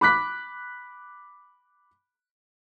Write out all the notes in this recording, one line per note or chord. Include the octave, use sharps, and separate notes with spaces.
B5 D6 F#6 B6